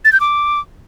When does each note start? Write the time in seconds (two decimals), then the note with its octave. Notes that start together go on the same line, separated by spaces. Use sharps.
0.05 A6
0.13 G6
0.20 D6